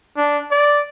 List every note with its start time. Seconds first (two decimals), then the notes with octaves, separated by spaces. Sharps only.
0.17 D4
0.51 D5